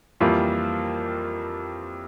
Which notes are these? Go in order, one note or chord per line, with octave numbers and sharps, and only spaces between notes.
F2 E3 G3 A#3 F4